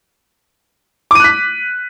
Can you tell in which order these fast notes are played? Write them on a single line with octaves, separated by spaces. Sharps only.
D6 D#7 F#6 B6